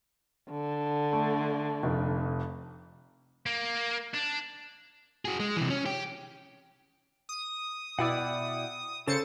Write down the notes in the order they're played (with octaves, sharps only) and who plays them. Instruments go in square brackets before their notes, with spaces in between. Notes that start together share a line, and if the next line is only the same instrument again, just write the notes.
[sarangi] D3
[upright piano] A3
F1 F2
[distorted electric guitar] A#3
D4
[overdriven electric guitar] F#4 G#4
G#3
C3 E3
C#4
G4 G5
[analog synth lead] D#6
[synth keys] B2 E4 D5 [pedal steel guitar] F#5 G5 E6
[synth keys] C#3 C5 C#7 [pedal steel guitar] A4 [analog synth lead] A6